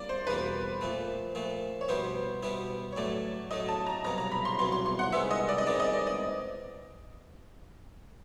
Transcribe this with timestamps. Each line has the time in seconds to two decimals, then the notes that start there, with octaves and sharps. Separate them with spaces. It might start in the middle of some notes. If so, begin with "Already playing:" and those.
Already playing: G3 A#3 D5
0.09 C5
0.27 E2 B2 G3 A#3 B4
0.81 A#2 F3 A3
1.35 A#2 F3 A3
1.81 C#5
1.89 B2 G3 B3 E4 C5
2.43 B2 G3 B3 E4
2.92 C#5
2.96 A2 F#3 A3 D5
3.51 A2 F#3 A3 D#5
3.68 A5
3.86 A#5
4.05 C2 B2 F#3 A#5
4.18 A#5
4.32 B5
4.45 C6
4.59 C2 B2 F#3 C6
4.72 C6
4.86 C6
4.99 F#5
5.12 C2 C3 D#3 G#3 B3 E5
5.31 D#5
5.49 D5
5.58 D#5
5.67 C2 C3 D#3 G#3 B3 D5
5.80 D#5
5.93 D5
6.07 D#5